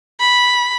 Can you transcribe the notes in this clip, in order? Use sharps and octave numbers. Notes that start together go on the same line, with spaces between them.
B5